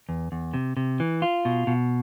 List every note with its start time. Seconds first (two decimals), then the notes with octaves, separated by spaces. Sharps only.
0.09 E2
0.32 E2
0.54 C3
0.77 C3
1.00 E3
1.22 F4
1.45 B2
1.67 B2